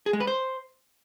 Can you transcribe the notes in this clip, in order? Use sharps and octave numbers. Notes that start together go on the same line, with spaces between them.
G#4
G#3
B4
C5